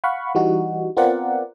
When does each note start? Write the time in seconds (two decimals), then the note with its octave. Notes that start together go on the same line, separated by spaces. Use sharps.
0.04 F5 F#5 B5 C#6
0.35 E3 G3 D#4 F#4
0.97 B3 C4 F4 A#4 D5 F#5